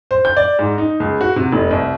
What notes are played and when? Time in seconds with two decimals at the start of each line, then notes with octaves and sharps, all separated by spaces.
0.11 C5
0.25 G6
0.37 D5
0.59 G#2
0.78 D#4
1.00 C#2
1.21 F#4
1.36 C3
1.52 F1
1.71 C2